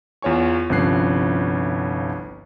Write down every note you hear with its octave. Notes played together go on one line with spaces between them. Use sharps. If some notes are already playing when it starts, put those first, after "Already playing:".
E2 F4 C#5 G#5 C#6
G1 C2 F3 C#4 F#6 C7